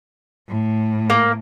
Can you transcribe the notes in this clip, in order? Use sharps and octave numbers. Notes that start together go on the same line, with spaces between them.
A2
A#3